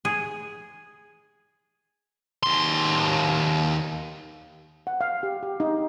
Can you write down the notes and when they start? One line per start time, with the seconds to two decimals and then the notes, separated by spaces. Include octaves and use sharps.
0.05 G#4
2.43 D#2 C6
4.87 F#5
5.01 F5
5.23 G4
5.43 G4
5.60 D#4